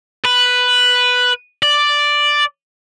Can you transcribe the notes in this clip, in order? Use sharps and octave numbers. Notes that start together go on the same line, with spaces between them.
B4
D5